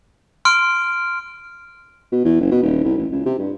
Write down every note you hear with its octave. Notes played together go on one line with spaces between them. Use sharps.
C6 F6 D7
B2
E2
F#1
B2
D#1
C2
A1
C#2
C3
G2